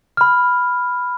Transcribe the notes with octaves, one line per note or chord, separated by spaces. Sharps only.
B5 F6